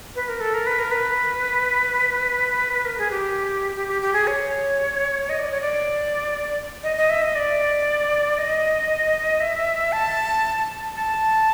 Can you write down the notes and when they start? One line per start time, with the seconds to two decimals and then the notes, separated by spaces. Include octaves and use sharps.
0.15 B4
0.28 A#4
0.41 A4
0.54 A#4
0.66 B4
0.79 A#4
0.91 B4
2.73 B4
2.85 A#4
2.98 G#4
3.11 G4
3.76 G4
3.88 G4
4.02 G4
4.13 G#4
4.27 C#5
5.29 D#5
5.40 D5
5.51 C#5
5.61 D5
6.83 D#5
6.97 D#5
7.10 E5
7.22 D#5
7.35 D5
8.38 D#5
9.40 E5
9.92 A5
10.96 A5